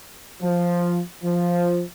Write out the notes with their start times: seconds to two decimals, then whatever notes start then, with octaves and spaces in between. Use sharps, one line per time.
0.42 F3
1.24 F3